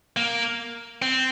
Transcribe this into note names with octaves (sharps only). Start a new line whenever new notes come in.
A#3
C4